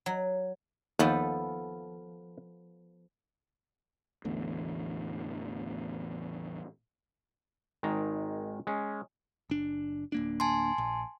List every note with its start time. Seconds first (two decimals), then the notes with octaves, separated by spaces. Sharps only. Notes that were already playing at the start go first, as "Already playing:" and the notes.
0.06 F#3
0.99 D#2 F3 B3 A4
4.25 A1 E2 A2 D3
7.83 G#1 D#3 G#3 A#5
8.67 G#3 C#4
9.50 F#1 D4
10.12 D1 A#3 D4
10.40 G#5 A5 C6
10.78 A#1